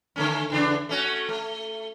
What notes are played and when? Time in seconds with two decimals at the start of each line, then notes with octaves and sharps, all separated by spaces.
0.16 D3 A3 C#4
0.50 E2 C#3 D4
0.89 A3 C#4 F#4
1.29 A3